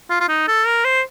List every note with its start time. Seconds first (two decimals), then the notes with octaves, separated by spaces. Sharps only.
0.10 F4
0.20 F4
0.29 D#4
0.48 A4
0.66 A#4
0.85 C5